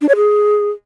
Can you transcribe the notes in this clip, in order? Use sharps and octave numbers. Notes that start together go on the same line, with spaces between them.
D4
C#5
G#4